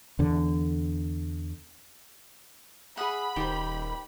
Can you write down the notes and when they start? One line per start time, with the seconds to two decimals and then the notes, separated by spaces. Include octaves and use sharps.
0.19 E2 D3
2.97 G#4 E5 F#5 B5 D#6
3.36 D#1 D#3 D#4 G4 C5 G5